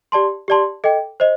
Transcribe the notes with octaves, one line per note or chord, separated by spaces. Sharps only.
G4 D5 A5 C6
G4 D5 A5 C6
A4 D#5 G5
C5 D#5